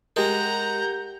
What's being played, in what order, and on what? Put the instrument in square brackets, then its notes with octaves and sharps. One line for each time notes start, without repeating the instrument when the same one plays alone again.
[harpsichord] G#3 [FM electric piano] G4 A#4 [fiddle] F#5 A#5 [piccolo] G6